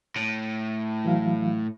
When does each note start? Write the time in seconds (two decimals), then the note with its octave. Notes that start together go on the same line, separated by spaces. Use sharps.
0.16 A2
1.05 E3 F#3 F5